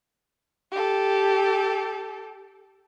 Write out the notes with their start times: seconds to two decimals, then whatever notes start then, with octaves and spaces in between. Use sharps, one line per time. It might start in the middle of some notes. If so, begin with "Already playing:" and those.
0.72 G4 A4